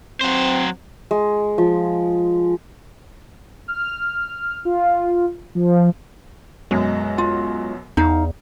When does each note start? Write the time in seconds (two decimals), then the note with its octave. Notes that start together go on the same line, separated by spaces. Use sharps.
0.21 F#3 C4 C5
1.11 G#3
1.58 F3
3.68 F6
4.65 F4
5.55 F3
6.71 F#2 B2 F#3 G#3
7.18 F4
7.97 E2 D#4 F5